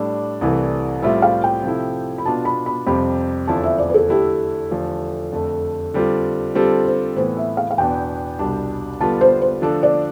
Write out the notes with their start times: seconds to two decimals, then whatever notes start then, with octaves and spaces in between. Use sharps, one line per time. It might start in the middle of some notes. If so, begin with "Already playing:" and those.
Already playing: A2 G3 D4 A4 D5
0.41 C2 C3 E3 A3 E4
1.02 A2 G3 C4 F4 E5
1.22 F5
1.44 G5
1.64 C3 F3 A3 E4
2.18 B5
2.25 B2 B3 D4 F4 A5
2.45 B5
2.66 B5
2.87 F2 C3 G3 C4 G4 B5
3.48 E2 D3 F3 C4 E4 A5
3.63 E5
3.78 D5
3.90 B4
3.94 A4
4.09 D3 A3 E4 G4
4.71 E2 D3 F3 A3
5.32 F2 D3 A3
5.94 D3 G3 C4 F4
6.55 D3 G3 C4 F4 G4 A4
6.85 C5
7.16 A2 E3 B3 C5
7.37 E5
7.57 F5
7.71 F5
7.78 E2 B2 B3 D4 G5
8.39 C2 B2 G3 D4
9.01 D3 G3 B3 F4 A5
9.21 C5
9.42 C5
9.62 D3 F3 A3 D4 A4
9.83 D5